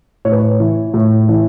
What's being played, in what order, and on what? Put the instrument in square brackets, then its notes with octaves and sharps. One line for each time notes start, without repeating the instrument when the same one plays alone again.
[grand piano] A2 C#5
B4
C#5
E3
A2
E3